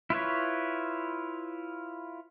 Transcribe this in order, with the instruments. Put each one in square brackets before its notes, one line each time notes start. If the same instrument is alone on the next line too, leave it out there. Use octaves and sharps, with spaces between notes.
[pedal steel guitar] E4 F4 B4 C#5